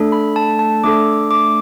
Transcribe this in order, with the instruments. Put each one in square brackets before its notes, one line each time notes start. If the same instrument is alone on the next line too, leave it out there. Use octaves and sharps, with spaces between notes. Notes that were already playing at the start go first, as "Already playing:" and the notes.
Already playing: [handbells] A3 D4 A4
B5
A5
A5
A3 D4 A4 D6
D6